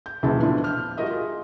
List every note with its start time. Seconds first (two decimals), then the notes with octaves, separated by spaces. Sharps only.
0.06 G6
0.23 D#1 C#2 E3 F#3 E5 A5
0.43 A2 D3 F3 B3 D4 F4
0.64 F6 G6
0.97 G3 F4 F#4 A#4 D#5 E5
1.10 F4 G#4